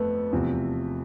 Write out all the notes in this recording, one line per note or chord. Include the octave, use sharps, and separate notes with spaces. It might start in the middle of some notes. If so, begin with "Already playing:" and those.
Already playing: F2 A3 B3
E2 C3 F3